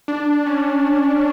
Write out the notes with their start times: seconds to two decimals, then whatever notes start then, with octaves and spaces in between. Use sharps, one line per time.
0.08 D4
0.46 C#4